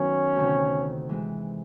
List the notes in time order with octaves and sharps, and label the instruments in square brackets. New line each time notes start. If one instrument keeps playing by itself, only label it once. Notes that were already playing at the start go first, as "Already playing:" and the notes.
Already playing: [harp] F#2 D#3 F#3 B3 [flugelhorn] C#4
[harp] D2 C3 D#3
E3 G#3 C4